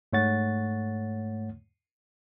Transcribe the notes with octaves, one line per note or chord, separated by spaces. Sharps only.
G#2 A3 C#5 F#5 A6